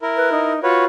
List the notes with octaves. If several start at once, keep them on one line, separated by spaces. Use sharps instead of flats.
E4 A#4
B4
D#4
F4 F#4 B4 C#5